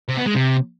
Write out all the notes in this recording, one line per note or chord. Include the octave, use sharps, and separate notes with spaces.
C3
B3
G#3
C3